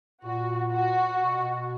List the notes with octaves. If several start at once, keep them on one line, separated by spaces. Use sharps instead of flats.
A#2 F#4
F#4
B2